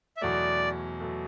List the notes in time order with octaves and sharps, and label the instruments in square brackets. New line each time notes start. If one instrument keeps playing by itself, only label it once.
[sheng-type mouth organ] E5
[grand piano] E2 B2 F#3 A3 [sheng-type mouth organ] D5
[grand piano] B2 F#3 A3